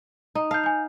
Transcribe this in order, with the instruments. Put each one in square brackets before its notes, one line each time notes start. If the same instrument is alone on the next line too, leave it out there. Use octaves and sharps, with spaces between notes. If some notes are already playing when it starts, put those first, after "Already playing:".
[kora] D#4
[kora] F5 [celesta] A5 G6
[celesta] G#5 G6